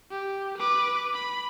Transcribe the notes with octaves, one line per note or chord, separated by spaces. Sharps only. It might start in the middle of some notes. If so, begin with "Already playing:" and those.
G4
B4 D6
B5